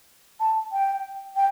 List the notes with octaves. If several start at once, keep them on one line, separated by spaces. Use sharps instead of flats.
A5
G5
G5